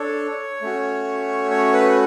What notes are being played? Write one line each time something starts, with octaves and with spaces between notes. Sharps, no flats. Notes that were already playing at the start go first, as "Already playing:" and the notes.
Already playing: D4 A4 C#5
A3 C#4 F#4
C#5
B4